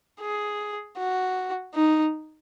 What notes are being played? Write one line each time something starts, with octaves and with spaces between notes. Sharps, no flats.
G#4
F#4
D#4